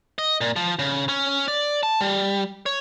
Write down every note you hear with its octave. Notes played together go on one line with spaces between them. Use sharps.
D#5
A#2
F3
C#3
C#4
D5
A5
G3
C#5